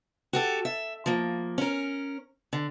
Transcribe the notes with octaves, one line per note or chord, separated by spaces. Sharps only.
F#4 G4 A4
E5
F3 A#3
C#4 A#4
D3